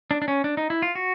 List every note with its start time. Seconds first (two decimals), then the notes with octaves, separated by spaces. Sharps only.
0.11 D4
0.22 D4
0.28 C#4
0.44 D4
0.57 D#4
0.70 E4
0.82 F4
0.95 F#4